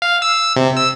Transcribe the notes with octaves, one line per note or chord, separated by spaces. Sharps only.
F5
E6
C3
E6